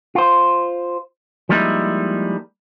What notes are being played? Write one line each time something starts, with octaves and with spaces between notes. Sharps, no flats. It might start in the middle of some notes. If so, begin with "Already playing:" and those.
F4 C5
F3 G3 G#3 A#3 D#4 E4